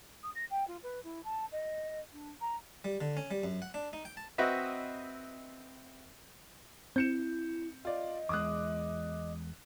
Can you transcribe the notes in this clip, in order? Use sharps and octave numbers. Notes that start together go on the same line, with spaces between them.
D#6
A#6
G5
F4
B4
E4
A5
D#5
D4
A#5
G3
D3
C#4
G3
F#2
F#5
D4
D#4
G5
A5
C4 F#4 B4 D#5 E5
C4 E4 G6 C#7 E7
F4 D5 D#5
E2 G#3 D6 D#6 F#6